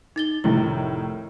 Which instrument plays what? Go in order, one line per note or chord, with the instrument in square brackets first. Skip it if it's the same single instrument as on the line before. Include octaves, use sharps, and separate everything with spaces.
[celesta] D#4 A6 G7
[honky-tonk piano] F1 A2 D#3 [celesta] E4